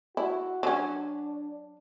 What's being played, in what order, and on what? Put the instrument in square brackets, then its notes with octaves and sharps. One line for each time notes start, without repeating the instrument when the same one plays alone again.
[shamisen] E4 [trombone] F#4
[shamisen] F#3 C#4 [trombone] D4